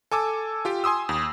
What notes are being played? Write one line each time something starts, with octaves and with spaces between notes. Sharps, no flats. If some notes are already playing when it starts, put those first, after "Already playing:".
A4 G#5 D6 E6
F4 G4 G5
G#5 C6 D#6 E6
D#2